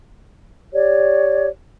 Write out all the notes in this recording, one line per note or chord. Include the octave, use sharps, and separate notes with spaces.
G4 C#5 D5